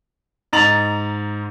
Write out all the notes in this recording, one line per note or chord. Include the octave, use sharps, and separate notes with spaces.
G#2 D#5 A#5 A6 F7 F#7